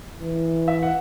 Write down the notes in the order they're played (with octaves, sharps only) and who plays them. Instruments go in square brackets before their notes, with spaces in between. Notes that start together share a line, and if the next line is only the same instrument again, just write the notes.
[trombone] E3
[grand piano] E5
F#5